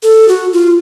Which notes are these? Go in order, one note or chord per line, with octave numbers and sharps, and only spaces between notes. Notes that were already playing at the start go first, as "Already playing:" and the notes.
A4
F#4
F4